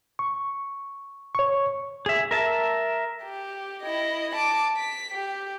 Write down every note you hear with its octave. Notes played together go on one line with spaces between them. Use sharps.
C#6
C#5 C#6
G#4 E5
A#4 E5 A5
G4
E4 D#5
A5 D6
B6
G4